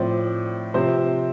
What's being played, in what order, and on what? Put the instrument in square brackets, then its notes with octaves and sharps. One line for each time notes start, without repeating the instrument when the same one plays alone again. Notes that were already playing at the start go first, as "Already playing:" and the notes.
Already playing: [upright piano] A2 F3 C4 D5
C3 F3 C4 C5